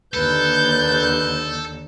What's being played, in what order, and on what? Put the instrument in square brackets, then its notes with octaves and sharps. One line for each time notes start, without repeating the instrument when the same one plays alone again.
[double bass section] D#2 D3 [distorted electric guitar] A4 [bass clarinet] B4 [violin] G6